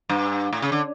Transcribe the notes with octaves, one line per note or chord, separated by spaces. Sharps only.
G2
A2
C#3
D3